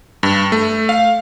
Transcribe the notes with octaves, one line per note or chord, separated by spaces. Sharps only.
G2
A3
F5